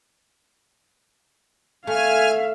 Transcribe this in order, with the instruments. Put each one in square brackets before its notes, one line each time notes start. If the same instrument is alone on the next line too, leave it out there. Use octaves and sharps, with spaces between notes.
[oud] A3 [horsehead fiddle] E5 F5 [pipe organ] G#5 F6